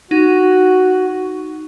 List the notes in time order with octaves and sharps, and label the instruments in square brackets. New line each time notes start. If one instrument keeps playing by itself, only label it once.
[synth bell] D#4 [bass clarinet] F#4